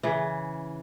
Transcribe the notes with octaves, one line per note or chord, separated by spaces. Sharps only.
C#3 E3